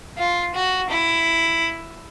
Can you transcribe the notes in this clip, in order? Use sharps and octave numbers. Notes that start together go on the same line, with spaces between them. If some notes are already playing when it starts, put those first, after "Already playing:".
F4
F#4
E4